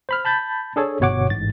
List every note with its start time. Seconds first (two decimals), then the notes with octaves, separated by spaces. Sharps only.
0.09 C5 B5 F6
0.25 A5 B5 G6 A6
0.76 D4 G#4 A4 C#5
1.00 G1 B2 C#5 F#5 D6
1.30 A1 G#2 A6